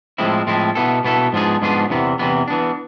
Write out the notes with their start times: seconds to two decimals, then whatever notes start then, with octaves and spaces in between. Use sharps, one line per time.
0.18 A2 F3 G#3 C4 E4
0.47 A2 F3 G#3 C4 E4
0.75 B2 B3 E4 A4
1.05 B2 B3 E4 A4
1.33 G#2 F3 B3 D4 G#4
1.62 G#2 F3 B3 D4 G#4
1.90 E2 C3 E3 B3
2.19 E2 C3 E3 B3
2.48 E3 B3 D4